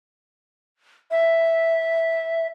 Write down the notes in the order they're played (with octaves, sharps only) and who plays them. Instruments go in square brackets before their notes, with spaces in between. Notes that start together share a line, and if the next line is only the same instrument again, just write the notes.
[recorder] E5